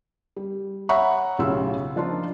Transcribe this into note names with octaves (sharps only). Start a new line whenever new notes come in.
G3
C#5 E5 F#5 A#5 B5 C#6
B1 A2 C#3 F4 G4 E6
F3 D4 D#4 F4